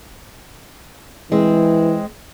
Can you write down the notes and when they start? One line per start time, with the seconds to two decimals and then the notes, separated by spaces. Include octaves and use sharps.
1.32 E3 G#3 C4